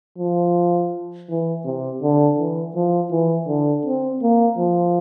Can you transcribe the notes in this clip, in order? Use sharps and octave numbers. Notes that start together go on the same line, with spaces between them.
F3
E3
C3
D3
E3
F3
E3
D3
C4
A#3
F3